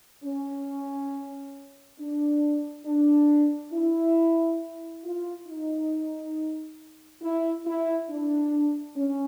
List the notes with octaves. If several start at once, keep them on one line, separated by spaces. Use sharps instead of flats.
C#4
D4
D4
E4
F4
D#4
E4
E4
D4
C#4